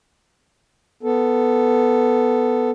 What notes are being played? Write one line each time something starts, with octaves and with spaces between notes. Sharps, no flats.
B3 A4